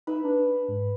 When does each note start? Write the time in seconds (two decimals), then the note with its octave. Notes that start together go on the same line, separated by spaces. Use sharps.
0.07 D#4 B4 E5
0.24 D4
0.68 G#2